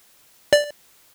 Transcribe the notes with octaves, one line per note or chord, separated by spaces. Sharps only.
D5